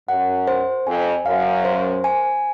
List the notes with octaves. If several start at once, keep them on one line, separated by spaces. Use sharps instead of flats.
F#2 F#5
C5
F2 G#5
F#2 F5
C5
G#5